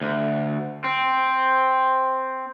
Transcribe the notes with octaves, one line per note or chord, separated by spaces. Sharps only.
D2
C4